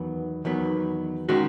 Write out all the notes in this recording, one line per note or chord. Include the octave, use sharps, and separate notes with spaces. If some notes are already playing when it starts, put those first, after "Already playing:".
Already playing: E2 D#3 F#3 B3
E2 D#3 F#3 B3
D#3 G#3 C#4 F#4